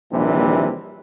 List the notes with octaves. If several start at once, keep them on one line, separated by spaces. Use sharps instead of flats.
A#1 D#2 C3 E3 G3